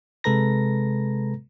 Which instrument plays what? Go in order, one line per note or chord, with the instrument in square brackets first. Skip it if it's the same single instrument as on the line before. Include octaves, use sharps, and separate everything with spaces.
[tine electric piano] C3 G#3 A4 B4 A#5 A#6